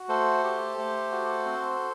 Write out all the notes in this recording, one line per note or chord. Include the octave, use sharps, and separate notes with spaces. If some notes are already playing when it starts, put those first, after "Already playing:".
Already playing: F#4
A3 A4 C5
G4
A3
F#4
C4